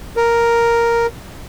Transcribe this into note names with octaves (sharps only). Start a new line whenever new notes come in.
A#4